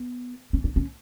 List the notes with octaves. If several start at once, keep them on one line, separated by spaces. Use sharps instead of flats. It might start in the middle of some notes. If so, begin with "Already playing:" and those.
Already playing: B3
C#4
D4
C#4